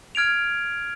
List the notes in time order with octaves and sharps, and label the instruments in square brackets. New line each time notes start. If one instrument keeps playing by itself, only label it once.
[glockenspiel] F6 G#6 D7 F7